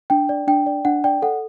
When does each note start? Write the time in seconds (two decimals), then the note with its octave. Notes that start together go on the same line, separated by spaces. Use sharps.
0.10 D4 G5
0.29 D5
0.47 D4 G5
0.66 D5
0.85 D4 F#5
1.04 D5 G5
1.22 A4 F#5